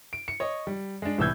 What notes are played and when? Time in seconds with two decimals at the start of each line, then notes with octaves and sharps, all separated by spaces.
0.13 D7
0.28 C#7
0.40 C#5 D#5
0.67 G3
1.02 G#3 D4
1.18 C2 A2 E3 E6 G6 G#6